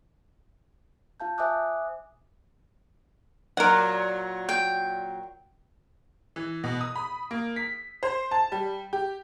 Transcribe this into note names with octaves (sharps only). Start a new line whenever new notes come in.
F4 F5 A5 G6
C5 E5 G#5 D6 D#6 F#6
A#2 F#3 A#4 F#5
G5
E3
B2
D#6
B5
A#3
B6
C5
A5
G3
G4